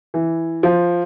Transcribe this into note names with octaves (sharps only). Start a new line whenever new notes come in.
E3
F3